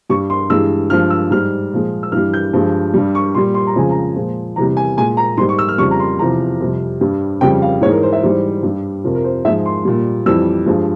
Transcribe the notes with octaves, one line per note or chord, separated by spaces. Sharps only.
G2 G3 C#6
C6
G2 E3 G#3 E6
G2 F3 G#3 F6
E6
G#2 G3 F6
A#2 F3 G#3
E6
G2 E3 G3 F6
G6
G2 F3 G#3
G2 G3
C#6
A#2 G3 C6
C6
A#5
F2 C#3 F3 G#3 G#5
A#5
A#2 F3 G#3
E2 C3 G3 A#5
G#5
A#2 G#3 G#5
A#5
G#2 G3 C6
C#6
E6
F6
F2 C#3 G3 C#6
A#5
C6
E2 C3 F3 A#5
F2 C3 G3
G2 G3
F2 C#3 G3 G5
F5
G#2 E3 G#3 C#5
A#4
C5
E5
G#2 E3 G3 C5
G2 G3
F2 C3 F3 A#4
A#4
C5
G#2 F3 G#3 E5
C6
A#2 G3
F2 E3 G3 E6
G2 F3 G#3